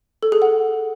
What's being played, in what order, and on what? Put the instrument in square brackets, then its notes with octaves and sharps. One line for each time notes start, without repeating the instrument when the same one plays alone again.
[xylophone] A4
G#4
F#5